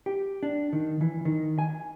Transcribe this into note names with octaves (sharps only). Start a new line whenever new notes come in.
G4
D4
D#3
E3
D#3
G#5